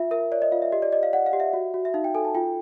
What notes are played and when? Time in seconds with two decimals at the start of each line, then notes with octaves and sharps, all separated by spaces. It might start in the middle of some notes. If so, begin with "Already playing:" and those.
Already playing: F4 E5
0.11 A#4 E5
0.32 C#5 D5
0.42 D#5
0.52 F4 F5
0.62 E5
0.72 G4 D#5
0.82 D5
0.92 D5 D#5
1.03 F5
1.13 D5 F#5
1.26 F5
1.33 G4
1.40 E5
1.53 F#4
1.74 F#4
1.85 E5
1.94 D#4 F5
2.04 G5
2.15 A4 G#5
2.25 A5
2.35 F4 G5